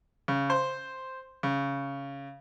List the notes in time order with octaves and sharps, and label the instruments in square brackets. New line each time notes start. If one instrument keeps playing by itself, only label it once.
[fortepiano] C#3
C5
C#3